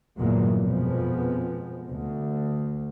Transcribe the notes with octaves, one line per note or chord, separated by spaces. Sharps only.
G1 E2 A#2 F#3 G#3 A#3
F2 B2 F3 G#3 B3
D2